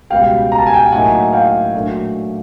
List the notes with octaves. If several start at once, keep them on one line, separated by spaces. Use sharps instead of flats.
C#2 B2 G3 F5 G5
A#5
A5
G#5
G5 A5
A2 F#3 A#3 D#4 F#5 G#5
F5 G5
A#2 F#3 A3 D4